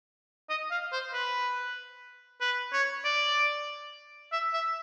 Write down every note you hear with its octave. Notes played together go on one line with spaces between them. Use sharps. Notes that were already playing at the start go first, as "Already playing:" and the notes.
D#5
F5
C5
B4
B4
C#5
D5
E5
E5